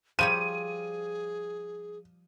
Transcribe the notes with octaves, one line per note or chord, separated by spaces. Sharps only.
F3 G3 G#4 C#5 D#7